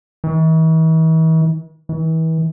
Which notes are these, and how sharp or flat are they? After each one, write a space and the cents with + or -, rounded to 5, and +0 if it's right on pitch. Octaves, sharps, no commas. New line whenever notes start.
E3 -45
E3 -35